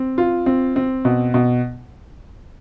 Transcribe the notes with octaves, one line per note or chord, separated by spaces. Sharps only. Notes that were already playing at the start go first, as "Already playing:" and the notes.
Already playing: C4
F4
C4
C4
B2
B2